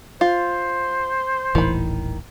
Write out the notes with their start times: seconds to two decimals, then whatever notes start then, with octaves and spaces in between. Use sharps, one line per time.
0.21 F4 C5
1.55 D#1 A1 D#3 E3 B5